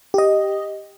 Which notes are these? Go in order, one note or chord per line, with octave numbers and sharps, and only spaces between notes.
G4 D#5